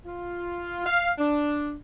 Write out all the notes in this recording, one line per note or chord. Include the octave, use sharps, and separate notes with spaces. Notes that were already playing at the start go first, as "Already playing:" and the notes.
F4
F5
D4